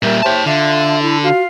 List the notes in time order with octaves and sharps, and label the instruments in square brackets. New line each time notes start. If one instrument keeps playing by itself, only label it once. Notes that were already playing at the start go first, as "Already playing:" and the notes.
[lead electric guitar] A#2 G3 [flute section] A#4 [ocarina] E5
[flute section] G4 C5 [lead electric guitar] C#5 A5
[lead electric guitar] D3 [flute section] D4 F4 [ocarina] E5
[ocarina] E4 [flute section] A4 B5
[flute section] F4 F5 [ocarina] F#4